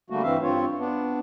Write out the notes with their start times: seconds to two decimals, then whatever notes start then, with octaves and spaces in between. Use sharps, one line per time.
0.10 D3 G3 A3 A#3 F#4
0.23 G2 E3 C4 E5 F5
0.42 G2 C4 F4 C#5
0.79 B3 D4